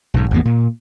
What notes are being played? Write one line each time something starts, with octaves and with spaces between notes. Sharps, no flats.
B1 G#2
G#1 E2 A#3 B3
A#2